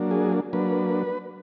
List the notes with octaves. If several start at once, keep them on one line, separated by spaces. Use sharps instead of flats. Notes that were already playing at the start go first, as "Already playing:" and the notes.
Already playing: F#3 A#3 D4
G#4
F#3 A#3 D4 B4